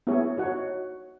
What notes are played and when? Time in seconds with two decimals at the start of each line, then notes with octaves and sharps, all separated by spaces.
0.07 B3 E4 G#4 C#5
0.37 D#4 F#4 C#5 F#5